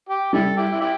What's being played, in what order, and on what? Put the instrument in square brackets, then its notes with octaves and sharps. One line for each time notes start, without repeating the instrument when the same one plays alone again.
[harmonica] G4
[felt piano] G3 [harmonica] E4 A4
[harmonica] E4 G4
E4
E4 G4